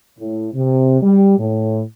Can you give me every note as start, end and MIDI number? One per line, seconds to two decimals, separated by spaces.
0.19 0.49 45
0.54 0.98 48
1.02 1.37 55
1.38 1.81 45